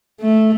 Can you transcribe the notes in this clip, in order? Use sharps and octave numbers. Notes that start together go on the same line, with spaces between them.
A3